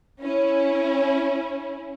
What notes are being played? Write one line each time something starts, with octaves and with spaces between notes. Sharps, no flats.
C#4 E4